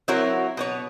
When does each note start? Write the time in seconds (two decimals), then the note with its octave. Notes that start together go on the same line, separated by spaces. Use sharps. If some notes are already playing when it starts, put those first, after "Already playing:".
0.08 F#3 C4 E4 F#4 A#4 C#5
0.57 B2 B3 C#5